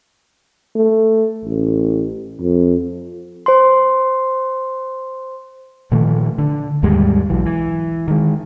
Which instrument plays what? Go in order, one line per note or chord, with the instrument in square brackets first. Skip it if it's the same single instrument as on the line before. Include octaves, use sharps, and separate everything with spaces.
[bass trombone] A3
A1
F2
[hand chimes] C5 C6
[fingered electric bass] A#2 D#3 F3 A3
D3
D#2 G#2 G3 G#3
B1 E3 F#3
E3
D#3 G#3